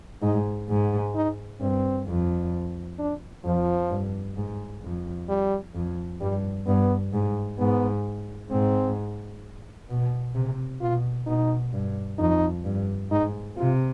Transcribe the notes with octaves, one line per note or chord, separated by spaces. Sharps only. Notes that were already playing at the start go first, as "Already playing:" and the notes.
G#2 D#4
G#2
D#4
G2 C4
F2
D4
F2 F3
G2
G#2
F2
G3
F2
G2 G3
G2 B3
G#2
G#2 B3
G#2 C4
B2
C3
B2 F4
B2 D#4
G2
F2 D#4
G2
G#2 D#4
C3 F4